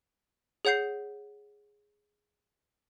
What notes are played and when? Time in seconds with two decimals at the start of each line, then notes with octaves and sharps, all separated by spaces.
0.65 G#4 C#5 F#5 G6 C7